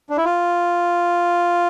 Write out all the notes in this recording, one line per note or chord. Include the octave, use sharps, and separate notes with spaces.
D4
E4
F4